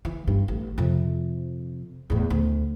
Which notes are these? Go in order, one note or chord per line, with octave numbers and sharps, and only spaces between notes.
E3
G2
A1
F2 C3
E2 A2
D2